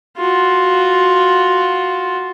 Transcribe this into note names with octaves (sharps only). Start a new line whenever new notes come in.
F4 F#4